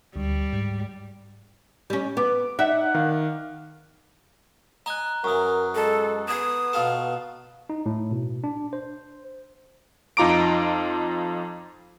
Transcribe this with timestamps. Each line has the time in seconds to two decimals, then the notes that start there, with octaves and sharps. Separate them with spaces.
0.16 D2 G3
0.53 G#2
1.90 G3 C#4
2.17 B3 D6
2.59 D#4 D5 E5 F#5
2.94 D#3 F5
4.86 D#5 G#5 A#5 F#6
5.24 F#2 E3 A#4 C#6 D#6
5.75 G#3 A4
6.28 B3 D#6 E7
6.73 B2 F4 A4 E7
7.70 D#4
7.86 A2
8.11 B2
8.44 D4
8.73 C5
10.17 F2 D#4 F4 A#5 D6 D7